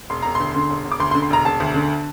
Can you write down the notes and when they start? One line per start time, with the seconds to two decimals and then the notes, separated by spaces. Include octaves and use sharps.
0.10 E1 C6
0.22 E1 A#5
0.35 C6
0.40 D2
0.55 D3
0.70 E1
0.85 E1
0.92 D6
1.00 D2 C6
1.11 C6
1.15 D3
1.22 C6
1.30 E1 A#5
1.45 E1 A5
1.60 D2
1.75 D3